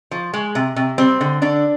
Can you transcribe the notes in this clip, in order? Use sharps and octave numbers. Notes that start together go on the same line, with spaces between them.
F3
G#3
C3
C3
G3 C4
D3
D3 D4